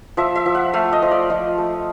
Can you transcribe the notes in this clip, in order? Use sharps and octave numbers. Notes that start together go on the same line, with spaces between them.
F3 E5
E5
F3
F#5
A3 F5
D#5
F3
D5
F3 D#5
A3